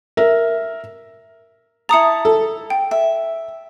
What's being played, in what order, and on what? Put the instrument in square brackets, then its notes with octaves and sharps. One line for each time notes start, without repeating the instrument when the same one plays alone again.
[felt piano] A#4 E5
[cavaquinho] E4 A5 [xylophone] A#5 D#6 C#7
[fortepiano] A4
[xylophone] G5
[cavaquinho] E5